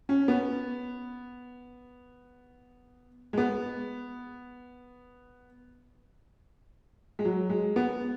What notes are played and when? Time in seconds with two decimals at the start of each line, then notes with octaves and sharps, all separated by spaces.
0.09 C#4
0.28 B3
3.33 G#3
3.38 B3
7.19 G#3
7.25 F#3
7.50 G#3
7.76 B3